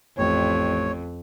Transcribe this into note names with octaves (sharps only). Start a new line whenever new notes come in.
A1 F2 C#5